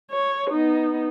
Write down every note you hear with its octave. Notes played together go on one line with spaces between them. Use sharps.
C#5
B3 D#4